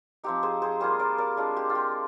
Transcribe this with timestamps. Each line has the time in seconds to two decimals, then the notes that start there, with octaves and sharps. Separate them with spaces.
0.24 F3 C4 D#4 G4
0.43 G#4 C5
0.62 G#4 C5
0.80 G3 A#3 F4 G#4 C5
0.99 A#4 D5
1.18 A#4 D5
1.37 G#3 D4 F4
1.56 G4
1.70 F4
1.75 G4